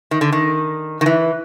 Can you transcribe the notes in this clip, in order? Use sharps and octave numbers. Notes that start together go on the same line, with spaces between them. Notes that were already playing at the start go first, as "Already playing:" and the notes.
D#3
D3
D#3
D#3
E3